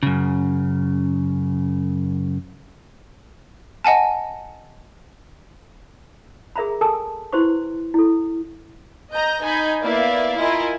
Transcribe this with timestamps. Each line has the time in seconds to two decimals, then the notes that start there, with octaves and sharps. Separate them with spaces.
0.03 F#2 C#3
3.84 D#5 F#5 G#5 A5
6.56 G#4 A#4 E5 A#5 B5
6.81 G4 A4 A#4 G#5 A5 E6
7.33 E4 G4 B4 C5 C6 C#6
7.94 E4 A4
9.14 D#5 A#5 G6
9.43 D#4 G#5 B5 G6
9.83 A#3 B3 E4 D5 E5 F5
10.38 E4 F4 A#4 D#5 G#5